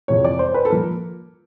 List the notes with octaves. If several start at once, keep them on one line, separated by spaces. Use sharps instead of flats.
F2 C3 E3 G#3 C#5
D5
C5
B4
A4
F3 A#3 A#4